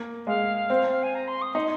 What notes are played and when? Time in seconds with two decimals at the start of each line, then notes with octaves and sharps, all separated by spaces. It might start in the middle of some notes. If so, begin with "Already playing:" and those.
Already playing: A#3
0.27 G#3 F5
0.70 C4
0.91 F5
1.03 G#5
1.14 A#5
1.27 C6
1.41 D#6
1.55 D#4 C6